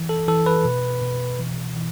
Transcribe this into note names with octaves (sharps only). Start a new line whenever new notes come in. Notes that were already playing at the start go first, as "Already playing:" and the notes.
Already playing: E3
A4
E3 A4
B4
B2
B2
E3
E3